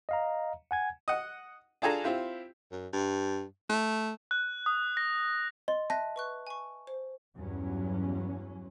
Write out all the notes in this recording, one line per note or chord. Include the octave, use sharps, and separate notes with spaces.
D#5 F5 A#5
F#5 G#5 G#6
D#5 F#5
D4 F4 G#4 A4 G#5 A#5
C4 E4 F4 G4
F#2
G2
A3
F#6
D#6
A#6
D#5 C6
E5 A5 F#6 A#6
B4 C#6 F#6
G#5 C#6
C5
E2 G2 F#3 C#4